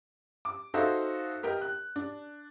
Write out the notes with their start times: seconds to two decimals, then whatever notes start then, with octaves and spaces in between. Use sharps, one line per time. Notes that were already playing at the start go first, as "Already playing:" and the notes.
0.45 D6
0.74 D#4 F#4 A4 C5 E5 F5
1.43 G4 A#4 D#5 G5
1.61 F#6
1.96 D4